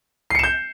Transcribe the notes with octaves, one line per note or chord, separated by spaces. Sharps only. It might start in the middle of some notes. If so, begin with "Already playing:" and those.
G6 C7 C#7 E7